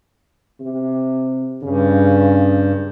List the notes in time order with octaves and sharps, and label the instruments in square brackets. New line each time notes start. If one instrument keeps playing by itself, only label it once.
[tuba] C3
[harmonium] G2 [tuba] C#3